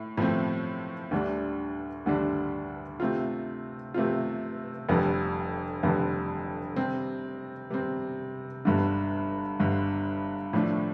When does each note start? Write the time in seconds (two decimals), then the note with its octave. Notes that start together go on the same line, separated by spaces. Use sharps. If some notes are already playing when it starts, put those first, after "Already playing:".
Already playing: A2
0.17 A2 F3 A3 C4
1.11 D2 D3 G3 D4
2.06 D2 D3 G3 D4
3.00 C3 A3 C4 F4
3.94 C3 A3 C4 F4
4.89 F1 F2 D3 G3
5.83 F1 F2 D3 G3
6.76 C3 G3 C4
7.70 C3 G3 C4
8.65 G1 G2 D3
9.60 G1 G2 D3
10.53 A2 F3 A3 D4